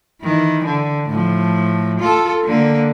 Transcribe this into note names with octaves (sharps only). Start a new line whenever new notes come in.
D#3 E3
D3
A2 F3
F4 A4
D3 A#3